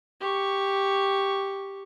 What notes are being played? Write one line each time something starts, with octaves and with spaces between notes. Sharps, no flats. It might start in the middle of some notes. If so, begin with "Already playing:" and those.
G4 C#6